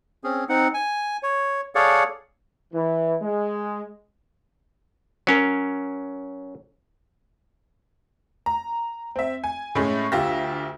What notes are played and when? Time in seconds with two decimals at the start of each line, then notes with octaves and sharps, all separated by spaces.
0.24 C4 C#4 G#4
0.49 C4 D#4 F#5
0.74 G#5
1.23 C#5
1.75 G#4 A4 C#5 D5 F5 F#5
2.73 E3
3.22 G#3
5.27 F#3 C#4 A#4
8.46 A#5
9.16 C4 E5
9.44 G#5
9.75 A2 G#3 A3 C#4
10.12 D2 F4 G4 E5 E6 A#6